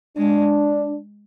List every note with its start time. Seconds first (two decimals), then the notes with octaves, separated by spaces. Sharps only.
0.17 G#3 D4